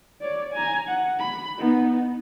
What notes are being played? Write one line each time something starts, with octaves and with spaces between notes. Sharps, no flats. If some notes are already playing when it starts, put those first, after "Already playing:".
C#5 D5
G#5 A#5
F#5
B5
B3 D#4